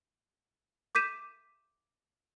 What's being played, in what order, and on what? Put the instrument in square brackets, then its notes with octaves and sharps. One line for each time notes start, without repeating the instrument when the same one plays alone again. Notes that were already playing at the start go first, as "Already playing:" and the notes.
[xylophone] D6 G6 B6 D#7 E7